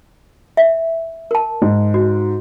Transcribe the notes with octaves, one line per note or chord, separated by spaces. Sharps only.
E5
A#4 A5
G#2
F#4